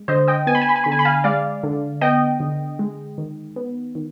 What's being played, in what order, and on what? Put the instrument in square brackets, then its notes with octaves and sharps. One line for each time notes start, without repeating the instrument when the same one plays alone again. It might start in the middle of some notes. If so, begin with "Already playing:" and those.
Already playing: [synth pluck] G#3
D3 C5 D#5
D#5 G5
B3 G#5
B5
G#5
B5
G#5
D3 B5
G#5
B5
F5 G#5
G#3 D5 F5
D3
B3 D#5 G5
D3
G#3
D#3
B3
D#3